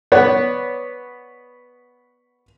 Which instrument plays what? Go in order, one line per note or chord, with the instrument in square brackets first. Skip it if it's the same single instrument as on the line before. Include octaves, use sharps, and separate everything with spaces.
[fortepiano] B3 C#5 D5 F#5